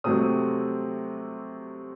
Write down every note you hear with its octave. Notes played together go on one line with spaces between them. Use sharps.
C3 F#3 A3 C4 D#6